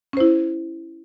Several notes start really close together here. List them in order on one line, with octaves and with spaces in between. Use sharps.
C#4 C5 E4